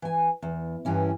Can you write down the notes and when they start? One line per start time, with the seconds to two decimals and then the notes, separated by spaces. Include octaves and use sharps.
0.02 E3 G#5
0.42 E2
0.85 G2 E3 C#4 E4